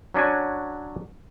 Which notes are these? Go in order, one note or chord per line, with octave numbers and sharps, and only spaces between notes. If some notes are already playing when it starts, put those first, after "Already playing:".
F#3 C#4 D4 F#4 G#5